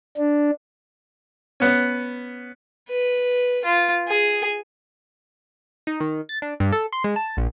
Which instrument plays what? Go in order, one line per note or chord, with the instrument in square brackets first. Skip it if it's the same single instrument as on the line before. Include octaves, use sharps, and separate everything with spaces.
[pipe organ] D4
[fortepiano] B3 C#4
[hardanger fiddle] B4
F4
G#4
[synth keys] D#4
D#3
A6
D4
G2
A4
C6
G#3
A5
A#1